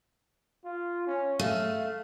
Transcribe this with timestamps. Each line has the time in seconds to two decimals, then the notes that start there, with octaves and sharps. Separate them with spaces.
0.65 F4
1.07 C#4
1.39 A3 F5